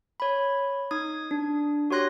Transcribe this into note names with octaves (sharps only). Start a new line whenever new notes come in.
C#5 B5
D#4 D#6 G#6
D4
F#4 G4 C#5 C6 F#6 A#6